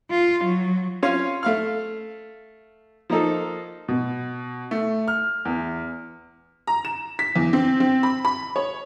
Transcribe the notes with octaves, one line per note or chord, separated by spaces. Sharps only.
F4
F#3
C#4 F4 C#5 F5 C6
A3 F5 F6
F3 A#3 D#4 A4
B2
A3
F6
E2
A#5
E7
B6
E2
C4
C4
B5
B5
C#5